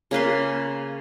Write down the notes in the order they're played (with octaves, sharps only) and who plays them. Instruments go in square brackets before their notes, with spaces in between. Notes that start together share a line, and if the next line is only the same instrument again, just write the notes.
[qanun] C#3 A#3 B4 C6